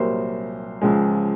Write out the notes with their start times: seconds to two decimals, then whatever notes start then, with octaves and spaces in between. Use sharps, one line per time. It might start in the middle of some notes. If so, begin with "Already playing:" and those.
Already playing: C2 A#2 F#3 A#4 C5
0.82 C#2 C#3 F3 G#3